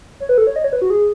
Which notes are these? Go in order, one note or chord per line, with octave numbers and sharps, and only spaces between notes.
C#5
B4
A4
C#5
D#5
C#5
B4
F#4
G#4